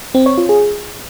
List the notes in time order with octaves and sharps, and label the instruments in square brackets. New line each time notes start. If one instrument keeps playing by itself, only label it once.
[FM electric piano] C4
C#5
F4
G#4